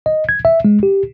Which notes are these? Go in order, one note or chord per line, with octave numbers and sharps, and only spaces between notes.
D#5
G#6
E5
G#3
G4